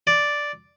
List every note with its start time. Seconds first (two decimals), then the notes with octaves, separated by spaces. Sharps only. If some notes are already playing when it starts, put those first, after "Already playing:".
0.07 D5